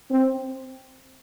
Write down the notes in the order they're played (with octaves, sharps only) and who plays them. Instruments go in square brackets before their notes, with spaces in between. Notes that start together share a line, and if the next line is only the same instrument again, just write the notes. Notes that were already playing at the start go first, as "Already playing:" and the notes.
[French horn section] C4